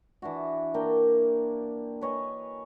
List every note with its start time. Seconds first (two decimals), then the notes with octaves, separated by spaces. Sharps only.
0.22 E3 D4 E4 F#4
0.74 A#3 D4 A#4 G5
2.01 B4 C#5 D#5 G#5